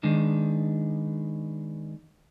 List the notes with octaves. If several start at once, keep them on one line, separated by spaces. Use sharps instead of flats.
D#3 G#3 B3 D4 D#4